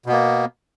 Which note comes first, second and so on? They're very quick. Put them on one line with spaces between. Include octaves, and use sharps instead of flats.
B2 B3 A#3